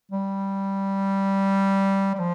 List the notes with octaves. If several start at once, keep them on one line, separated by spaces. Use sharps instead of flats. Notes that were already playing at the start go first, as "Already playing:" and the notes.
G3
G3
F3